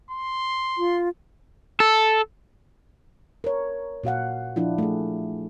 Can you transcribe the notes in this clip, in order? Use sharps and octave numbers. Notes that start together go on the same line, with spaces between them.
C6
F4
A4
A#4 C#5
A#2 F#4 F5 F#5
F3 D4 E4 F4
A3 G#4